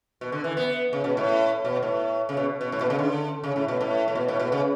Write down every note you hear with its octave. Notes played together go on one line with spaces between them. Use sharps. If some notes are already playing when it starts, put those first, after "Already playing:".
B2
D3
E3
B3
C#3
B2
A2
B2
A2
C#3
B2
B2
A2
B2
C#3
D3
C#3
A2
B2
A2
A2
B2
A2
B2
C#3